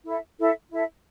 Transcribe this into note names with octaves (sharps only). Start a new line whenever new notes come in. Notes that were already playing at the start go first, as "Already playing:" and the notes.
E4 A4 E5
E4 A4 E5
E4 A4 E5